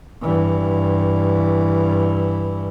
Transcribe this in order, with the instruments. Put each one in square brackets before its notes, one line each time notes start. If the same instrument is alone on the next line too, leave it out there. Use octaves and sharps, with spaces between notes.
[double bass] G2 E3